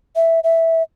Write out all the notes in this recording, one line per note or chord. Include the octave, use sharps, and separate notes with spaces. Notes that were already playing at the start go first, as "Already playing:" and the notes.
E5
E5